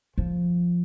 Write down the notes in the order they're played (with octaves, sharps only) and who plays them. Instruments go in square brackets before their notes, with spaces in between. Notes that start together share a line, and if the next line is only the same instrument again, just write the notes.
[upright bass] F3